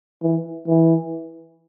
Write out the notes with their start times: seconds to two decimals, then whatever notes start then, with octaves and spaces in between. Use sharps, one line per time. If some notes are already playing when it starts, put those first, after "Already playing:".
0.23 E3
0.68 E3